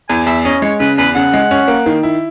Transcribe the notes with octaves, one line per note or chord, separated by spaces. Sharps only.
E2 G#5
E2 E5
C#4 D#5
G#3 C#5
C#3 B4
E2 B4
C#3 F#5
G#3
C#4
A#3
D#3
E4